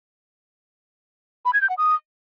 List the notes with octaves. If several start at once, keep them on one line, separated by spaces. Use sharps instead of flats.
B5
G#6
G6
F#5
D#6